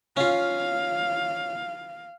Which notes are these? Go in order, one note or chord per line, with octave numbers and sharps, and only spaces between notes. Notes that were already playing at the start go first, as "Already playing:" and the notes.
C#4 F4 F5